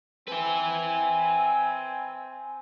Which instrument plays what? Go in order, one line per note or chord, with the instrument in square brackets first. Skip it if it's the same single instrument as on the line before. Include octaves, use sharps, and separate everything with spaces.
[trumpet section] C4 G#5 [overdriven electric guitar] B4 E5